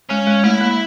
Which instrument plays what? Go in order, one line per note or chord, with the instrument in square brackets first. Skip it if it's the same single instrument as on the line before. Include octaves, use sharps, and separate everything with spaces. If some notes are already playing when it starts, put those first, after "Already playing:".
[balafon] G#3 [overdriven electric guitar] C#4
[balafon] G#3
[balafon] A3 [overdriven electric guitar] E4
[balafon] A#3